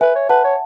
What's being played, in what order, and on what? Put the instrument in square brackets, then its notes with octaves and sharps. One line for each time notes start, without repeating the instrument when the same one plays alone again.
[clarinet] B4 [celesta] E5 G#5
[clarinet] C#5
[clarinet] B4 [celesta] F#5 A5
[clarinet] C#5